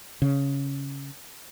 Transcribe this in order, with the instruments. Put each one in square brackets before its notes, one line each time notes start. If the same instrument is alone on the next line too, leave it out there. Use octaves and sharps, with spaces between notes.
[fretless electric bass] C#3